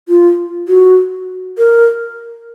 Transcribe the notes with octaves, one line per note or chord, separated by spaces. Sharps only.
F4
F#4
A#4